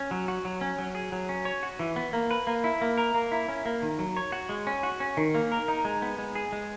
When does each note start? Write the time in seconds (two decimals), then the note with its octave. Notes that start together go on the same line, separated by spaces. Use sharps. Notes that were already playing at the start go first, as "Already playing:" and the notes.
Already playing: C#4
0.11 F#3
0.28 F#4
0.45 F#3
0.61 C#4
0.78 F#3
0.95 G#4
1.12 F#3
1.29 C#4
1.45 C#5
1.63 F#4
1.79 E3
1.96 B3
2.13 A#3
2.31 B4
2.47 A#3
2.64 E4
2.81 A#3
2.98 A#4
3.14 A#3
3.32 E4
3.49 C#4
3.66 A#3
3.82 D#3
3.99 F#3
4.17 C#5
4.32 F#4
4.49 G#3
4.67 C#4
4.83 F#4
5.00 C#4
5.17 D#3
5.35 A#3
5.52 A#4
5.68 D#4
5.85 G#3
6.02 B3
6.18 G#3
6.35 G#4
6.53 G#3